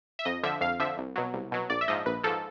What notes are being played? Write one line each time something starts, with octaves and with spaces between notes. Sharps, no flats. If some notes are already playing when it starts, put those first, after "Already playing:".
E5
F2 D#5
D3 F3 E5
F2 F5
D3 F3 E5
C2
B2 F#3
C2
B2 F#3
A#1 D5
E5
G#2 F3 D#5
A#1 B4
G#2 F3 A4